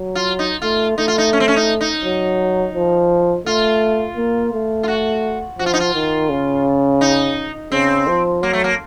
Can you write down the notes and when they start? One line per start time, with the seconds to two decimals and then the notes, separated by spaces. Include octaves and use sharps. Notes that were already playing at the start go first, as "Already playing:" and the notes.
Already playing: F#3
0.15 F4
0.39 D#4
0.62 A3 F4
0.98 A3 D#4
1.08 F4
1.18 D#4
1.33 C#4
1.40 C4
1.48 C#4
1.56 D#4
1.81 D#4
2.05 F#3
2.75 F3
3.46 A3 F4
4.17 A#3
4.53 A3
4.83 F4
4.88 F#4
5.58 F3 F#4
5.66 F4
5.74 D#4
5.80 F4
5.94 D#3
6.29 C#3
7.01 D#4
7.72 C#3 C4
8.07 F3
8.42 F#3 A#3
8.53 A3
8.64 A#3